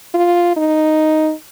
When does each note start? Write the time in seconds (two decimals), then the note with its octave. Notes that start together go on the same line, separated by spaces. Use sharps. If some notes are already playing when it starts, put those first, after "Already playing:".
0.14 F4
0.56 D#4